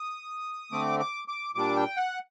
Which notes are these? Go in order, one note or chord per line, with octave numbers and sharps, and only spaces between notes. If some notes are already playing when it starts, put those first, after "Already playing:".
Already playing: D#6
D3 A3 C4 D6
D6
D6
A#2 G3 D4 D6
G5
F#5